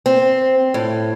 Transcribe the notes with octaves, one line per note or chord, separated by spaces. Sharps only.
C4
A2